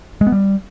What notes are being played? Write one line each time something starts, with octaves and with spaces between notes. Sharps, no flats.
G#3
B3
G3